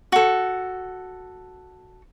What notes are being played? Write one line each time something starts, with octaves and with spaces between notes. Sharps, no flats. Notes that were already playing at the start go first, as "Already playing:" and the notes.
F#4 A4